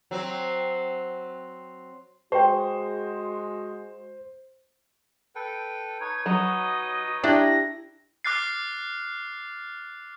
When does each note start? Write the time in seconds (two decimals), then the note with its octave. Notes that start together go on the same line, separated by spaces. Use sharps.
0.11 F#3 C4
2.32 G#3 F#4 C5 G5 C#6
5.35 A4 B4 G5
6.00 D#4 B4 C#5 G#6
6.26 F#3 D#5
7.24 D4 E4 G4 G5 A#6
8.24 D6 F6 F#6 A6 C7